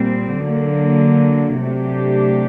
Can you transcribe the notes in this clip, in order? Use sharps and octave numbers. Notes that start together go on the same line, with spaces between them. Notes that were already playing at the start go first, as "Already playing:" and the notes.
Already playing: A#2 G3 C4
D3 F#3 A#3
C3 F#3 A3 D4 G4